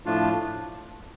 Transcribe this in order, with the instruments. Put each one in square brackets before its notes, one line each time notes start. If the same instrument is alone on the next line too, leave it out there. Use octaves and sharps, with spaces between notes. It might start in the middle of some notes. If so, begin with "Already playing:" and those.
[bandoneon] A2 F3 A3 D4 F4